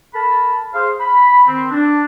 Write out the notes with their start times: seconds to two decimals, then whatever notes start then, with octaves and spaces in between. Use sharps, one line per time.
0.14 A4 A#4 A5 B5
0.73 G#4 C5 F5
1.00 B5
1.47 D#3 C4
1.71 D4